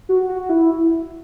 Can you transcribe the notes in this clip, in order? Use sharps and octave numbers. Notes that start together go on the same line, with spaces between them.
F#4
F#4
E4